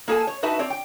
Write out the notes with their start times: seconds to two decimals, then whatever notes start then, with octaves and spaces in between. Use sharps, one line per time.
0.08 A#3 G#4 A4 F5 G#5 A5
0.27 C#5
0.43 D#4 F#4 B4 E5 A5
0.59 C4 C#5 D5
0.70 G5